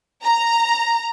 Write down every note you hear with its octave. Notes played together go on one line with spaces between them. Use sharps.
A#5